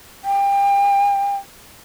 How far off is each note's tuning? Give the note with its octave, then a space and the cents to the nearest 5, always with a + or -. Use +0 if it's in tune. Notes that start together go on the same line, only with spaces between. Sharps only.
G5 +30